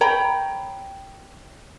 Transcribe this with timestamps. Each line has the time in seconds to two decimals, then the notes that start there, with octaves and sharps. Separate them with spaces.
0.01 C#5 G5 A#5 B5